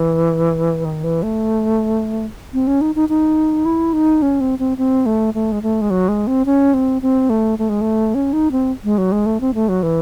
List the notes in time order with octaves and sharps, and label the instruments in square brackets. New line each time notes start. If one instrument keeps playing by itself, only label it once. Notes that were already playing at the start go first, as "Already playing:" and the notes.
Already playing: [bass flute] E3
D#3
E3
A3
C4
C#4
D#4
D#4
D#4
E4
D#4
C#4
C4
C4
C4
A3
A3
G#3
A3
G#3
F#3
G#3
C4
C#4
C4
C4
A3
A3
G#3
A3
C#4
D#4
C4
G#3
F#3
G#3
A3
C4
A3
F#3
E3